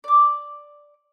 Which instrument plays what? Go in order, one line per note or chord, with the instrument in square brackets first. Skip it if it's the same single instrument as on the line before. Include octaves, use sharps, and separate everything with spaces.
[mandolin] D5 D6